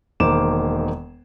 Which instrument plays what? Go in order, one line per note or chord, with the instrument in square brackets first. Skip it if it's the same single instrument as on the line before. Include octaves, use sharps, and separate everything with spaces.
[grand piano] E1 D#3 A#3 C5 D6 E7